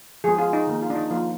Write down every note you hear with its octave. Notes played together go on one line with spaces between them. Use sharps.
F3 G#3 B3 G#4
F4
D#4
D#3 A#3
F4
D4
D#4
F3 A#3 F4